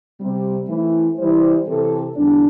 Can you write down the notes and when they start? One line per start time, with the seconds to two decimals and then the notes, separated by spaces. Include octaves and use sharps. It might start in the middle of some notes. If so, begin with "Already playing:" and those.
0.19 C3 G3 C4
0.68 E3 A3 C4 E4
1.18 E3 G3 E4 G4 C5
1.66 C3 E3 C4 A4
2.16 E2 D3 G3 D4